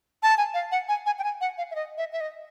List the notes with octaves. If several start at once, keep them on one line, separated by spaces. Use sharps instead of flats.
A5
G#5
F5
F#5
G#5
G#5
G5
G#5
F#5
F5
E5
D#5
E5
E5
D#5